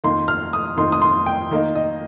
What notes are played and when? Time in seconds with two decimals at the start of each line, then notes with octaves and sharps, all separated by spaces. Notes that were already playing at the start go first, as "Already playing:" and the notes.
0.04 F2 D#3 A#3 D#4 C6
0.28 F6
0.53 D#6
0.77 F2 D#3 A#3 D#4 C6
0.92 D#6
1.02 C6
1.26 G5
1.51 D#3 A#3 D#4
1.75 D#5